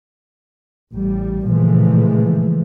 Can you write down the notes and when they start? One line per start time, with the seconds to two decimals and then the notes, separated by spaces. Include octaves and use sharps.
0.93 A1 G3
1.46 A#2 C#3 E3 F3 G#3 A3